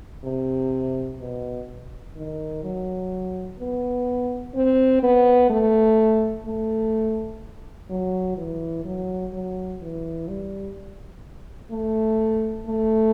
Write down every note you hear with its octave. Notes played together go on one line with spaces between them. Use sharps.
C3
B2
D#3
F#3
B3
C4
B3
A3
A3
F#3
E3
F#3
F#3
E3
G3
A3
A3